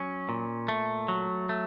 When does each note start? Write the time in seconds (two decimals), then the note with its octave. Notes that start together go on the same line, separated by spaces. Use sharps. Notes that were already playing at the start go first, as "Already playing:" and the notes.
Already playing: F#3 C#4
0.29 A#2
0.68 A3
1.08 F#3
1.49 A3